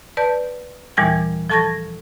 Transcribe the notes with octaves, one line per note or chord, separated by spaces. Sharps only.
B4 D5 A5 G6
D#2 A#2 E3 G3 G#5 G#6
F3 A4 A5 C#6 G#6 A#6